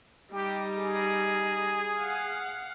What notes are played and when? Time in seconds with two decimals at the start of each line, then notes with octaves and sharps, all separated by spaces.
0.32 G3 D#4 G4
0.77 G#4
1.99 F5 F#5